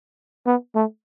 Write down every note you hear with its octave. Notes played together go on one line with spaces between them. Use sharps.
B3
A3